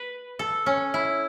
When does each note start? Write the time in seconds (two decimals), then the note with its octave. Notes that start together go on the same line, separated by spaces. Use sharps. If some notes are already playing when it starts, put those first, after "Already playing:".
Already playing: B4
0.39 A4
0.66 C#4
0.94 E4